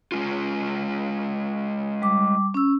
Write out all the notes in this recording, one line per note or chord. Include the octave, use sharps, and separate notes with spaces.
G#3 C#4 F4
G3 D6
C#4 E6